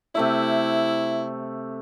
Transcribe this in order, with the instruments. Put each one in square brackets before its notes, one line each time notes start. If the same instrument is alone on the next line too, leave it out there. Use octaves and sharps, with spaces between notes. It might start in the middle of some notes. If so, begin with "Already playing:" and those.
[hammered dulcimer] C3 A3 E5 [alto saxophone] E4